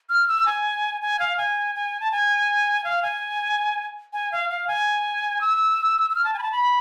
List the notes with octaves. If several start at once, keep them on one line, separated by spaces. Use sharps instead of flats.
F6
E6
G#5
G#5
F5
G#5
G#5
A5
G#5
F5
G#5
G#5
F5
F5
G#5
E6
E6
F6
A5
G#5
B5
A5
B5